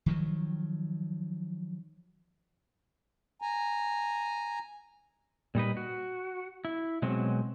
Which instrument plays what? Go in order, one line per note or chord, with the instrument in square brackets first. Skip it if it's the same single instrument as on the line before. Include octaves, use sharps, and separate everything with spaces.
[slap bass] D#3 F3 F#3
[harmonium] G#5 A#5
[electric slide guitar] A#2 G3 D#4 B4
F#4
E4
B2 F#3 G#3 C4